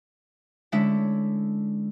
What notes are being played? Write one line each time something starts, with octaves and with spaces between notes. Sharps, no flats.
D3 G#3 C#4 E4 E5